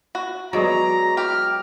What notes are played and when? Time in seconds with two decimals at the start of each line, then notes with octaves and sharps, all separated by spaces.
0.15 F#4
0.53 F#3 G#3 B3 D5 A#5
1.17 G4 F6